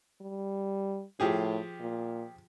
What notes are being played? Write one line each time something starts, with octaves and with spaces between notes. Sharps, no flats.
G3
A2 F3 G4 G#4
A#2